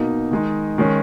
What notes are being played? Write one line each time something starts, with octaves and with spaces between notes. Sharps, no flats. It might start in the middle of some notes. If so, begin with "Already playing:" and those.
Already playing: B2 A#3 D#4
D#3 G#3 D#4
D#3 G#3 C#4